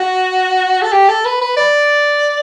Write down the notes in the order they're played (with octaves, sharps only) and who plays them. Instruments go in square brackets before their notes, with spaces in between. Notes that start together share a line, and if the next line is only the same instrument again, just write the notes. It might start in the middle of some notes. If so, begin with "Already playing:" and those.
Already playing: [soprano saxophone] F#4
A4
G4
A4
B4
B4
D5